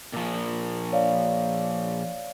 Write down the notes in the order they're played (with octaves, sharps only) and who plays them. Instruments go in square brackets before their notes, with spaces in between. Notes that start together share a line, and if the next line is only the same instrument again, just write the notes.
[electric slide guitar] A#2 F3
[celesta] C#5 D5 F5